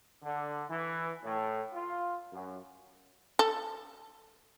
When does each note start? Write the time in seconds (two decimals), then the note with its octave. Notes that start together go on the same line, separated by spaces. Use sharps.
0.23 D3
0.69 E3
1.24 A2
1.73 F4
2.33 F#2
3.39 A4